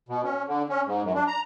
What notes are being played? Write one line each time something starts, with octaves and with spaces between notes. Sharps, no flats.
B2
C#4
D3
C#4
G#2
F#2
D4
A#5